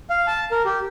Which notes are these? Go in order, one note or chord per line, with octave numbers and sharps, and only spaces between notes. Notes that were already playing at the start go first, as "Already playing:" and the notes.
F5
A5
A#4
G4